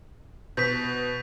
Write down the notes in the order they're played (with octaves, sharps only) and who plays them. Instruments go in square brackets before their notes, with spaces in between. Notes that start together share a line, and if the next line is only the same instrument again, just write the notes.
[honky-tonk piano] B2 [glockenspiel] G6 B6